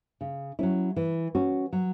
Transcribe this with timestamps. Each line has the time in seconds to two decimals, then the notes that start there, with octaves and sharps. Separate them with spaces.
0.21 C#3
0.59 F#3 C#4 E4
0.96 E3
1.35 C#4 F#4
1.73 F#3